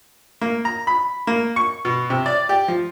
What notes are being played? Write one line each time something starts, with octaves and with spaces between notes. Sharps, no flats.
A#3
A#5
B5
A#3
C#6
B2
C3
D5
G4
F3